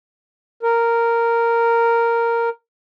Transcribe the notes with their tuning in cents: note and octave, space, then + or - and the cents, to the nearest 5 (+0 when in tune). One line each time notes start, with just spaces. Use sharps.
A#4 -5